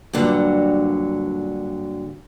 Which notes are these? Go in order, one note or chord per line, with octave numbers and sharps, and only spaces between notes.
G2 A#2 D3 F#3